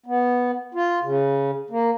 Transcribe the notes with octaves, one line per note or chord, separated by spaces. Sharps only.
B3
F4
C#3
A#3